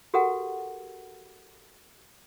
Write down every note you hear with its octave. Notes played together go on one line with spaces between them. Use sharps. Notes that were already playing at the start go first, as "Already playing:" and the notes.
F#4 G4 A4 A#4 F#5